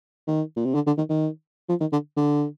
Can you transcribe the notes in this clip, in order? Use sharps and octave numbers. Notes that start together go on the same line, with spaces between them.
D#3
A#2
C3
D3
D3
D#3
D#3
F3
D#3
D3
D3